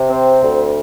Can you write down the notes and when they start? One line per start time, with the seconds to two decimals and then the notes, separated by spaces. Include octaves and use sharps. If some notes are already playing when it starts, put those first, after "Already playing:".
Already playing: C3
0.10 C4
0.43 D2